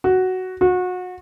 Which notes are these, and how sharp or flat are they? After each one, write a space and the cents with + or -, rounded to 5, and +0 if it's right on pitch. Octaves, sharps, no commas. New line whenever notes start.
F#4 +5
F#4 -30